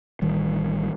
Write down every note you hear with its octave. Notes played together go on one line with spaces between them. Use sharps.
A1 D#3 G3